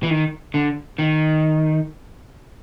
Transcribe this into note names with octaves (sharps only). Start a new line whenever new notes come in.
E3
D#3
D3
D#3